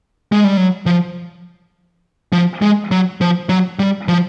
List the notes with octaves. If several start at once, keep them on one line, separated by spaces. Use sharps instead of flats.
G#3
G3
F#3
F3
F3
G#3
F#3
F3
F#3
G3
F3